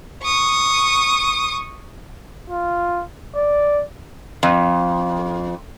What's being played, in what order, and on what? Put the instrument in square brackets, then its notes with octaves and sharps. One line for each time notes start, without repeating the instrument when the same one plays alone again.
[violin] C#6 D#6
[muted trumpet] F4
D5
[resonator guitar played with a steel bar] F2